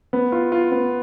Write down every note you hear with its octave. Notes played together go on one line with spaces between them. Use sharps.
B3
F4
F4
B3